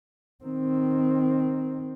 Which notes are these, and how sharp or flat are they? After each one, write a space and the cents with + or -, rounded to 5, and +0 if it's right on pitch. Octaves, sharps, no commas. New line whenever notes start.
D#3 +0 C4 +0